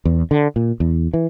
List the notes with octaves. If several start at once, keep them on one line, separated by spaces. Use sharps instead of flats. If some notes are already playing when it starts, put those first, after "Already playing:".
E2
D3
A#2
E2
E3